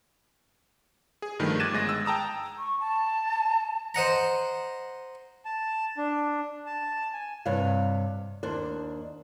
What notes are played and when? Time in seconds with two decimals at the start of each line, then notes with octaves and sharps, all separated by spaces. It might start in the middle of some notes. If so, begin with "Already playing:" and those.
1.22 G#4
1.39 G2 D#3 F3 A3
1.60 D6 F#6 G#6 A6 D#7 E7
1.73 G1 G#3 A#6
1.89 E6
2.05 G5 A5 A#5 D#6 E6
2.58 C#6
2.80 A5
3.95 C5 D#5 F#5 A#5
5.45 A5
5.98 D4
6.66 A5
7.13 G#5
7.46 G2 C3 C#5 F5
8.43 D#2 D4 C5